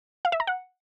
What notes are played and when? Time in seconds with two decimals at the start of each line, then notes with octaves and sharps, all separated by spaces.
0.25 F5
0.32 E5
0.40 A#5
0.47 F#5